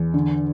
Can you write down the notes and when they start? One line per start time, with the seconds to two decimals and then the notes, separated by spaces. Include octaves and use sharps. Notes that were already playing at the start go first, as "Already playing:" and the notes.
Already playing: E2
0.14 D3